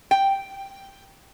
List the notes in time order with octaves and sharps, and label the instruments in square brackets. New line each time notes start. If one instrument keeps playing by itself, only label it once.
[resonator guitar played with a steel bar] G5